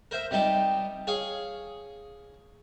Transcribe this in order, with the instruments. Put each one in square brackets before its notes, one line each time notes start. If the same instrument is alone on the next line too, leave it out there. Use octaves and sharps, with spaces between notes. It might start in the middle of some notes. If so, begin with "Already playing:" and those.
[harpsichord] A#4 C5 E5
C3 G3 D#4 A5
G#4 C#5 F5